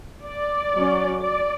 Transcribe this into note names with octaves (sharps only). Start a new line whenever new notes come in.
D5
F#3 C#4
D5